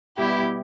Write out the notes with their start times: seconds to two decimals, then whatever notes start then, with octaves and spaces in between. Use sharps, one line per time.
0.18 B2 G3 B3 E4 G4